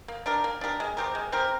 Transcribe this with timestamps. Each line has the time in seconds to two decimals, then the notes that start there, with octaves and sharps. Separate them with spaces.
0.08 A#3
0.26 D4 G4 A#4
0.44 A#3
0.61 D4 G4 A#4
0.80 G#3
0.97 C4 G4 A#4
1.15 G#3
1.32 C4 G4 A#4